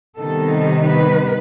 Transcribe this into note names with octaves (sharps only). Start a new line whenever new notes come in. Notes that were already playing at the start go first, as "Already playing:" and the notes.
C3 D#3 G3 B3 D#4 A4
B4